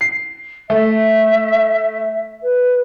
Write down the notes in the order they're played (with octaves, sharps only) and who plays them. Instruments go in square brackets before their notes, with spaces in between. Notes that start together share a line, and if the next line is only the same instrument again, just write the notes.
[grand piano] C7
[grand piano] A3 [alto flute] E5
[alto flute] B4